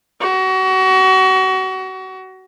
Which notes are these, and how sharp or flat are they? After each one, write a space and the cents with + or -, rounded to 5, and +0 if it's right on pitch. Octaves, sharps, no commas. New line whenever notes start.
F#4 +30